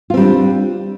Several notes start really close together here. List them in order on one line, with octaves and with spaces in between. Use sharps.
F4 C4 G3 D4